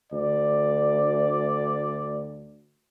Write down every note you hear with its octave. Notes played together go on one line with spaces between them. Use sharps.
D2 D5